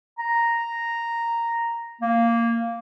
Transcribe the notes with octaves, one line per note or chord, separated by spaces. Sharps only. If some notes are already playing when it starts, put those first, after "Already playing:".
A#5
A#3